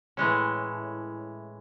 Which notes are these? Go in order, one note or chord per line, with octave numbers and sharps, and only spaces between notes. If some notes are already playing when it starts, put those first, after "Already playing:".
A2 E3 G#3 C#4